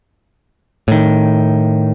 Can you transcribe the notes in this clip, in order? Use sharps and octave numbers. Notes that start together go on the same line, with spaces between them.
A2 D#3